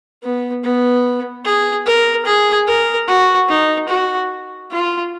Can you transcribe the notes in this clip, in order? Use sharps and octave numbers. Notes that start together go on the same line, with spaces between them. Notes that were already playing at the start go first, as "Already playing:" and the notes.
B3
B3
G#4
A#4
G#4
A#4
F#4
D#4
F#4
F4